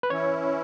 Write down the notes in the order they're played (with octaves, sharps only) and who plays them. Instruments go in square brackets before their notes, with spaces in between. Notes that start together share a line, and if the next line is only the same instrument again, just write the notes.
[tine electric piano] B4
[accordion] E3 C#4 E4 [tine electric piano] C#5